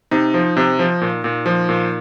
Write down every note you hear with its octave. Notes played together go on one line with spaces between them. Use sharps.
C3 D#4
F3
C3
F3
A#2
A#2
F3
A#2